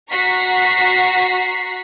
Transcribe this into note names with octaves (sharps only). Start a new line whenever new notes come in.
F#4 A#5 C#6 B6 C7